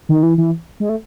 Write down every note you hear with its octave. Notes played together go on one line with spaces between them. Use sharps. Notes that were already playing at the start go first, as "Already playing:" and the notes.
D#3
E3
E3
G#3
A3